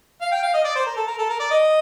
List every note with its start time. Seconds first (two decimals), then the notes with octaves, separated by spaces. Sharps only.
0.21 F5
0.32 G5
0.43 F5
0.54 D#5
0.64 D5
0.75 C5
0.86 A#4
0.97 A4
1.07 A#4
1.19 A4
1.29 A#4
1.40 D5
1.51 D#5